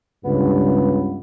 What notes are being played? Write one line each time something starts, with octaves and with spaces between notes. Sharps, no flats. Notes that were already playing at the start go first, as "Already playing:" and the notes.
C#2 G2 B3